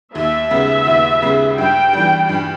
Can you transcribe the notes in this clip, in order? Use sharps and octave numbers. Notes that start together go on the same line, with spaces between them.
D#2 E5
C#3 G#3 B3
D#2
C#3 G#3 B3
G2 G5
E3 G3
G2